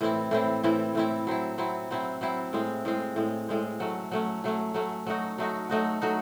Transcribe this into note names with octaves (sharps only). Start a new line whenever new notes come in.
A2 E3 C4 E4
A2 E3 C4 E4
A2 E3 C4 E4
A2 E3 C4 E4
F#3 C4 E4
F#3 C4 E4
F#3 C4 E4
F#3 C4 E4
A2 G#3 C4
A2 G#3 C4
A2 G#3 C4
A2 G#3 C4
F#3 A3 C#4
F#3 A3 C#4
F#3 A3 C#4
F#3 A3 C#4
F#3 A3 D#4 F#4
F#3 A3 D#4 F#4
F#3 A3 D#4 F#4
F#3 A3 D#4 F#4